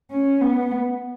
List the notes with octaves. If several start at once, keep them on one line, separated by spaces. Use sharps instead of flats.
C#4
B3